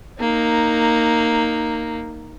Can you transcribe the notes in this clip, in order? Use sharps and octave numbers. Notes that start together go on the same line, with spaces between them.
A#3 D#4